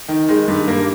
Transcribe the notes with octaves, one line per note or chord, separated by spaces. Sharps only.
D#3
D#3 G#3
G2
G2 A#3